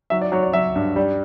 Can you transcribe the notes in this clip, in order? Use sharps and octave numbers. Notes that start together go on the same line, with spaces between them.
F#3 E5
D5
F#3 C#5
D5
F#3 E5
G2
G3